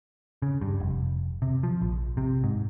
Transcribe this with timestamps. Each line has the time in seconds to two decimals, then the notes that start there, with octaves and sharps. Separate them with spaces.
0.42 C#3
0.61 G2
0.80 F1
1.42 C3
1.63 F3
1.82 A#1
2.17 C3
2.44 G#2